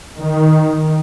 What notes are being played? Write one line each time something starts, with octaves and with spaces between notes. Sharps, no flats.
D#3